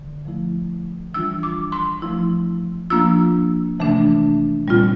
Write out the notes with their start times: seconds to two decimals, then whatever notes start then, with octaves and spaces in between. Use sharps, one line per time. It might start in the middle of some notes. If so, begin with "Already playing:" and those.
Already playing: D3
0.25 F3 A3 E4
1.14 E3 G3 D4 F4 E6
1.43 D6
1.72 C6
2.02 F3 A3 E4
2.90 F3 A#3 D4 F4 E6
3.79 C3 E3 A3 D4
4.68 A#2 G3 C4 F4